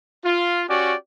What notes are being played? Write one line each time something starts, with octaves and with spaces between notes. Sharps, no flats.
F4
C#4 F#4 G4 D5